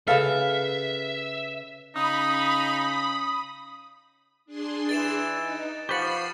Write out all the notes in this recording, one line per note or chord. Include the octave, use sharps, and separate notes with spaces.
C#3 A4 B4 E5 F5
C#3 D#4 B5 D#6
D4 G#4 C6
E3 A6 D7 E7
D#4
F3 G4 B4 F#5 B5 C#6 A6 C7